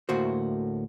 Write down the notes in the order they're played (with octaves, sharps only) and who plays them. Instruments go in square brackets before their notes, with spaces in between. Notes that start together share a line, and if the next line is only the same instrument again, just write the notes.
[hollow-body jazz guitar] D2 A2 A#3 F#4 C5